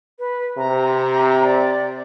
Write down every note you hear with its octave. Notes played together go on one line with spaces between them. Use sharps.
B4
C3 A#5
D5